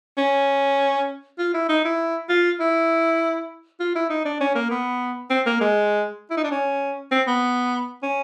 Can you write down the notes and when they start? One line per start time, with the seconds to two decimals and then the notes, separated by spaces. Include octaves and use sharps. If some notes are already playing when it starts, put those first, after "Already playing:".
0.17 C#4
1.38 F4
1.54 E4
1.69 D#4
1.84 E4
2.29 F4
2.60 E4
3.80 F4
3.95 E4
4.10 D#4
4.25 D4
4.40 C#4
4.55 A#3
4.70 B3
5.30 C4
5.46 A#3
5.61 G#3
6.30 E4
6.37 D#4
6.44 D4
6.51 C#4
7.11 C4
7.27 B3
8.03 C#4